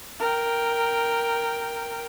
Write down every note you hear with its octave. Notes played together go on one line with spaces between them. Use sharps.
A#4 G5